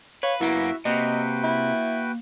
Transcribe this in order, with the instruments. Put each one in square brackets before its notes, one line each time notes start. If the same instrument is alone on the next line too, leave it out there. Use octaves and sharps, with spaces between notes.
[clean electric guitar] B4 [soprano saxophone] C#5 [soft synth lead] F5
[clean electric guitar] F#2 A#3 [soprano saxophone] B3 [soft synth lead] E4 [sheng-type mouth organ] F#4 E5
[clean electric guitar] C3 [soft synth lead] A#3 [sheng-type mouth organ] F#4 B4 G5 [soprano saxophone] D#5
[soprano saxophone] E4